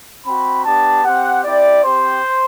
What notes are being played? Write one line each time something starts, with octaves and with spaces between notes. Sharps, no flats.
C4 F#4 B5
B3 D4 G4 A5
C4 G4 F#5
C4 E4 G4 D5
C4 G4 C5